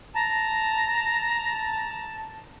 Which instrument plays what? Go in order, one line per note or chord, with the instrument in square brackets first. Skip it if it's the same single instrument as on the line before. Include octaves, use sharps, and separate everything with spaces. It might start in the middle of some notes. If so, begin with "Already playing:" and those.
[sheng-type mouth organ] A5 [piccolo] A#5